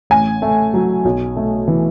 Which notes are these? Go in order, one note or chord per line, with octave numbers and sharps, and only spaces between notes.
A1 G#5
A3
F#3
B1
A3
E3